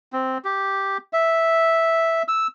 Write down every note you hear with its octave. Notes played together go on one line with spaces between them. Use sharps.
C4
G4
E5
E6